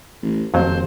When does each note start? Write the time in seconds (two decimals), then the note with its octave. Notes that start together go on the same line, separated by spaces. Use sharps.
0.22 A1
0.54 D#1 F2 F#3 C5